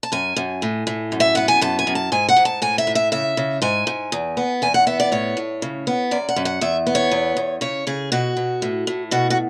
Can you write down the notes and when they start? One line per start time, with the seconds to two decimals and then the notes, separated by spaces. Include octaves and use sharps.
0.03 A5
0.12 F#2 G#5
0.36 F#2
0.62 A2
0.87 A2
1.12 F#2
1.20 E5
1.35 B3 F#5
1.48 G#5
1.61 F#2 A5
1.79 G#5
1.87 F#2
1.95 A5
2.12 G#2 G#5
2.29 F#5
2.36 G#2
2.45 A5
2.62 A2 G#5
2.78 E5
2.87 A2
2.95 E5
3.12 C#3 E5
3.37 C#3
3.62 G#2 G#5
3.87 G#2
4.12 E2
4.37 B3
4.62 E2 G#5
4.74 F#5
4.87 B3 E5
5.00 D5
5.12 A2 C#5
5.37 A2
5.62 C#3
5.87 B3
6.11 F#2 D5
6.29 F#5
6.36 F#2
6.45 F#5
6.61 E2 E5
6.87 B3
6.95 C#5
7.11 E2
7.37 E2
7.61 C#3 C#5
7.87 C#3 G#4
8.12 B2 F#4
8.37 B2
8.62 A2
8.87 A2
9.11 B2 F#4
9.30 F#4